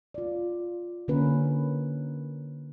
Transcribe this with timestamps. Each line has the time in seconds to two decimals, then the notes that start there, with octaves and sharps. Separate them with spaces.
0.14 F4 D5
1.08 D3 A#3 C#4 A#4 B4